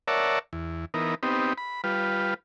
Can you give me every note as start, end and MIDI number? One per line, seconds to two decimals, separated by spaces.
0.08 0.39 70
0.08 0.39 73
0.08 0.39 74
0.08 0.39 76
0.08 0.39 78
0.08 0.39 81
0.53 0.85 40
0.94 1.15 52
0.94 1.15 59
0.94 1.15 63
0.94 1.15 70
1.23 1.53 59
1.23 1.53 60
1.23 1.53 63
1.23 1.53 67
1.58 1.81 83
1.84 2.34 55
1.84 2.34 65
1.84 2.34 71